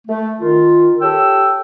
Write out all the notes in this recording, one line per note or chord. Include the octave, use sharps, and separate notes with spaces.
A3
D#3 F4
G4 A4 C#5 G5 E6